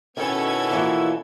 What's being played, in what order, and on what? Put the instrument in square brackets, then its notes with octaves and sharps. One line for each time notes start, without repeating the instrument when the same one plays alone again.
[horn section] B2 B3 E4 [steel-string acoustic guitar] D#3 [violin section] C#4 A4 G#6
[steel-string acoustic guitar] E3 F3 A#3